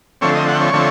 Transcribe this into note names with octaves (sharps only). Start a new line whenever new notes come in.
D3 F3 A3 C4 C#5
D#5
F#5
C#5
D3 F3 A3 C4